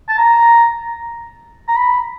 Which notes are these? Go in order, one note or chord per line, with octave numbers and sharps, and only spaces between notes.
A5
A#5
A#5
B5